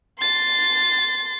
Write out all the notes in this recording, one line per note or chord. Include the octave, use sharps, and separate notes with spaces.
C6 A6